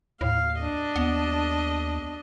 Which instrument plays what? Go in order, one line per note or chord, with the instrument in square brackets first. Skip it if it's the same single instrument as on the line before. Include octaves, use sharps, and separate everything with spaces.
[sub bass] D#2 [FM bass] A2 [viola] F5
[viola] D4 D#5
[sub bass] D#2 [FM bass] B3